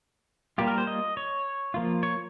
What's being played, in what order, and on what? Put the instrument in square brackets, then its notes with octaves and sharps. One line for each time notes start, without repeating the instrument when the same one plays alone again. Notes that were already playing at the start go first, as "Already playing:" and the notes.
[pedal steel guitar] G3 A#3 F4 G4
A#4
C5
D#5
C#5
F3 A#3 F4
C#5